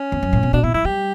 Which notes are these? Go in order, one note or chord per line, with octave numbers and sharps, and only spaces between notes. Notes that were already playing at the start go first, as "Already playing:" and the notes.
Already playing: C#4
E2
F#2
A2
B2
B2 D4
B2 E4
G3 E4
G3 G4